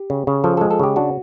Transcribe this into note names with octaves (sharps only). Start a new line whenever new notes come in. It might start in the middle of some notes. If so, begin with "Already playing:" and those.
Already playing: G4
C#3
C#3
F3 A4
G#3 A4
A4
C#3 G4
D4 F#4